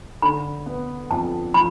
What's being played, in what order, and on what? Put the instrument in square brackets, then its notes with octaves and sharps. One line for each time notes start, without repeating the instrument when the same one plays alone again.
[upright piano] D3 [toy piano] B5
[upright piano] B3
[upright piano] F2 [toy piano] A5
[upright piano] F3 [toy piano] B5